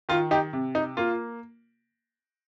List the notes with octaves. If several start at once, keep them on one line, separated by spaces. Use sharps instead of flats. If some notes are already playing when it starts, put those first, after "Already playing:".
D#3 F4
D#4 G4
C3
D#4
A#3 F4